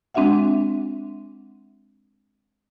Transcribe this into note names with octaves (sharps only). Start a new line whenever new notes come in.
G#3 C4 D4 F#4 E5 F#5